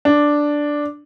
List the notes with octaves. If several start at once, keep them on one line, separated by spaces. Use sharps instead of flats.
D4